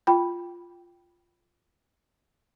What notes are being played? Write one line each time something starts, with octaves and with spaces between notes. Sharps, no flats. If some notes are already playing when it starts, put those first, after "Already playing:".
F4 G5 B5